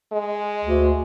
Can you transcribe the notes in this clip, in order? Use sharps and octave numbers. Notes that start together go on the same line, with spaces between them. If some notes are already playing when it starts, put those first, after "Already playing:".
G#3
D2